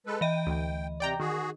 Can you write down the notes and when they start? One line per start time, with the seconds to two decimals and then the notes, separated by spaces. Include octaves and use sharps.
0.06 G#3 A4 B4
0.21 E3 D#5 G5
0.46 D2
1.00 C3 D5 G5 A#5
1.20 D#3 F#4 G#4